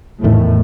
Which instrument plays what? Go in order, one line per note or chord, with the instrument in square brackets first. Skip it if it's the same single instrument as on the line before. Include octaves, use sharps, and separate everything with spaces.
[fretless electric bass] E2 D#3 A3 [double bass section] A2